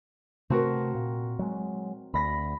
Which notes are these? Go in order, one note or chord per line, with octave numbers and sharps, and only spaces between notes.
C3 A3 C4 F#4 A#4
A#2
F#3 G#3
D2 B5 A#6 B6